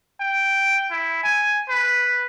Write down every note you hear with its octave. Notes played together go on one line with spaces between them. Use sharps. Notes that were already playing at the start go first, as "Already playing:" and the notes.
G5
E4
G#5
B4